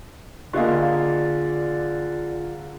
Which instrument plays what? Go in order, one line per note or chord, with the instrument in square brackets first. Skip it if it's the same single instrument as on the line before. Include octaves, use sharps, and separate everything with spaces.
[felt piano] D3 A#3 [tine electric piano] F4 G#4 [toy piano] G4 D#5 F5 [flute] D5